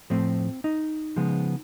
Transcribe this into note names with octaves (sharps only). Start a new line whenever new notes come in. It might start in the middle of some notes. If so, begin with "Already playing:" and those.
A2 F3 A3 C4
D#4
C#3 F3 G#3 B3